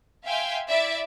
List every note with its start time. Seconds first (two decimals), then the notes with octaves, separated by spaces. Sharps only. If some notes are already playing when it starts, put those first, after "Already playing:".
0.24 E5 F5 G5 G#5 C6
0.68 E4 D5 E5